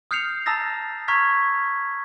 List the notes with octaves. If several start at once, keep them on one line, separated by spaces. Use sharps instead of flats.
D#6 F6 G6 C7 C#7 F7
A5 A#5 D#6 E6 A6 A#6
A#5 C#6 F6 G#6 B6